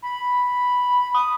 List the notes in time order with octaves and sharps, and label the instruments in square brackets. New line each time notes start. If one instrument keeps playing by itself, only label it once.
[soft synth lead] B5
D#6